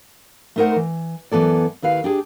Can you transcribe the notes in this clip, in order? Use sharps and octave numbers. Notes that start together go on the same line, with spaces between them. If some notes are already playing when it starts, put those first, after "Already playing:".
A3 B3 D#4 A#4 C5 F#5
E3
F#2 E3 B3 A4 D5
D#2 E4 B4 F5
D4 G4 G#4